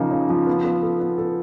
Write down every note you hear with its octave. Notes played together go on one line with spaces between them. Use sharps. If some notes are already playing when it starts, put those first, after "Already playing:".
Already playing: C#3 F3 A#3 D#4
C#3
F3
B3
B3
A4
B3
A4